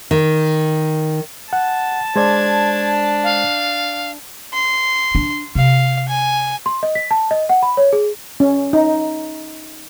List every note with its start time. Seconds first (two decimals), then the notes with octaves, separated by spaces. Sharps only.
0.11 D#3
1.53 F#5 A5
2.16 G#3 D4 C5 D5 G#6
3.24 F5
4.53 C6
5.15 D4
5.55 C3 F5
6.08 G#5
6.66 C6
6.83 D#5
6.95 B6
7.11 A5
7.31 D#5
7.49 F#5
7.63 B5
7.77 C#5
7.93 G#4
8.40 C#4
8.73 D#4